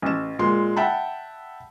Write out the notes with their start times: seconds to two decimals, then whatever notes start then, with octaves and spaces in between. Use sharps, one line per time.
0.02 A1 E7
0.39 A#2 G#3 C6
0.76 E5 F#5 G5 A5 B5